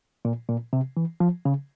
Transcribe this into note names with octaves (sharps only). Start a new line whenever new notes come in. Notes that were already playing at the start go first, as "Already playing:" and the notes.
A#2
A#2
C3
E3
F3
C#3